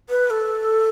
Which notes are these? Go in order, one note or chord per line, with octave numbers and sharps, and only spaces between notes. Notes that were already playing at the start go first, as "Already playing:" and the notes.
B4
A4